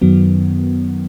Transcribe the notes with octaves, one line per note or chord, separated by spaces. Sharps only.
F#2 D#3 F#3 B3